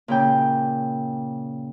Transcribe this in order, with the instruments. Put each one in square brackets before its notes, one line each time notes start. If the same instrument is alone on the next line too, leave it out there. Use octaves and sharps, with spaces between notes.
[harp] A#2 C#3 G5